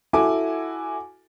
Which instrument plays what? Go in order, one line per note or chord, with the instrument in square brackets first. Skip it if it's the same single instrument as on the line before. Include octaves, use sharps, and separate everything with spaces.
[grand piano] E4 F#4 A4 G#5 D6